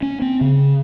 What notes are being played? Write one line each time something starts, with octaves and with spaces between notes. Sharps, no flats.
C#4
C4
C#3